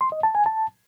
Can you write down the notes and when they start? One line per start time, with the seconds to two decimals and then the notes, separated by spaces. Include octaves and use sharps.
0.01 C6
0.12 D#5
0.23 A5
0.35 G#5
0.46 A5